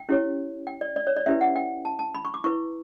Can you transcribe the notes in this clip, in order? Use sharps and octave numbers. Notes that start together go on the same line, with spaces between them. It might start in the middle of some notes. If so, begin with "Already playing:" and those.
Already playing: G5
C#4 E4 G4 C#5
G5
D5
D5
C#5
D5
C#4 E4 G4 B4 E5
F#5
G5
A5
A5
B5
C#6
D6
E4 B4 C#6